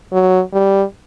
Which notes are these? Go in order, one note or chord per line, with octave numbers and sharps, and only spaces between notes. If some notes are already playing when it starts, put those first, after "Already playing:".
F#3
G3